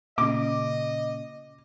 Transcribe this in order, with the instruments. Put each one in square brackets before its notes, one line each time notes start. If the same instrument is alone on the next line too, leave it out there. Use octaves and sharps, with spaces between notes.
[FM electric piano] A#2 C#3 [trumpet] D#5 [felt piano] D6